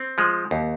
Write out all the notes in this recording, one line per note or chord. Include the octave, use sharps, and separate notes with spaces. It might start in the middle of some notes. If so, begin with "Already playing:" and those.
Already playing: C4
F3 G#3
D#2